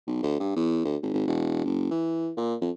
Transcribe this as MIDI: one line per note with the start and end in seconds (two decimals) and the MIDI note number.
0.07 0.19 35
0.23 0.36 38
0.40 0.56 43
0.56 0.82 40
0.85 0.96 38
1.02 1.10 32
1.14 1.25 32
1.27 1.65 28
1.65 1.89 30
1.91 2.31 52
2.37 2.55 46
2.61 2.71 41